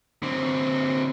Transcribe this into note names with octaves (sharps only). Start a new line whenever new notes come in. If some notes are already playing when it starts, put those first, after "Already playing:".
D3 C4